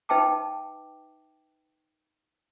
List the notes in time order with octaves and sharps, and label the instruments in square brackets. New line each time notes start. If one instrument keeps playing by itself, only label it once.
[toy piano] D#4 B4 E5 G5 A5 D6